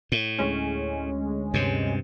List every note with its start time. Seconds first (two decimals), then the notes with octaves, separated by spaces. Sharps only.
0.12 A2
0.39 D2 G#3 C#4
1.54 G2 C3